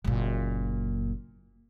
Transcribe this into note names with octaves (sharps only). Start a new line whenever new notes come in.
F#1 A#2